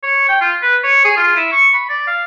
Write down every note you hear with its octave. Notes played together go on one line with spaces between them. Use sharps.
C#5
G5
F4
B4
C#5
G#4
F4
E4
C#6
B5
D5
F5